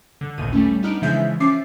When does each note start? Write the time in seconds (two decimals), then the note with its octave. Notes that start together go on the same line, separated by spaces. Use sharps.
0.21 D3
0.37 A1 D#2 A#2 D#3 D#7
0.53 G3 A3 C#4
0.83 B3 D4 D#4 F6 D7
1.02 C#3 E3 F3 G#3 E5 G6
1.40 F3 C#4 E5 D6 A6 C7